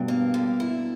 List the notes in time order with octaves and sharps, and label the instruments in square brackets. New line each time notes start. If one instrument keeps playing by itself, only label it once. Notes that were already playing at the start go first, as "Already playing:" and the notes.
Already playing: [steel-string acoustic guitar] G2 [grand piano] B2
[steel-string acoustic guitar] A#3
D3
E4